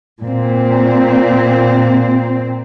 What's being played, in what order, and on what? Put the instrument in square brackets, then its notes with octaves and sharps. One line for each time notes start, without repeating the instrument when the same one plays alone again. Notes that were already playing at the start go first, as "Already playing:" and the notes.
[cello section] A#2 C4